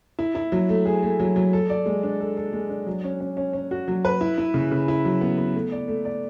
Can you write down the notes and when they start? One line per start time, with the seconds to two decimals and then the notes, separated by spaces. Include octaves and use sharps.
0.19 E4
0.35 E4
0.52 F#3
0.69 A3
0.85 G#4
1.03 A3
1.20 F#3
1.36 F#3
1.53 A4
1.70 D5
1.86 G#3
2.03 D4
2.20 A4
2.37 A4
2.53 G#3
2.69 D4
2.87 F#3
3.04 C#4
3.20 C#4
3.37 C#4
3.53 C#4
3.71 F#4
3.88 F#3
4.05 B4
4.21 E4
4.38 E4
4.54 C#3
4.71 C#3
4.88 E4
5.05 F#3
5.21 B3
5.37 B3
5.55 A3
5.72 D5
5.88 A3
6.05 D5